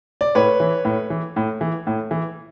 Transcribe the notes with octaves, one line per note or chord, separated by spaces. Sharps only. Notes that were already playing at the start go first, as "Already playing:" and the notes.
D5
A2 B4 C#5
E3
A2
E3
A2
E3
A2
E3